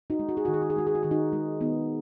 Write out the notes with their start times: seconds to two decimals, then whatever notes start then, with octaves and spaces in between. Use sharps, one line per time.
0.10 D#4 F#4
0.19 G#3
0.29 F#4
0.37 G#4
0.45 D#3 F#4
0.54 G#4
0.62 F#4
0.70 G#4
0.76 G#3 F#4
0.87 G#4
0.95 F#4
1.03 D#3 G#4
1.11 D#4 F#4
1.33 G#3
1.61 D#3 B3 D#4